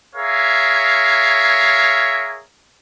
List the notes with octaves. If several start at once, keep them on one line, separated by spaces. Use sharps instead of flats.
G#4 A#4 C#5 E5 F5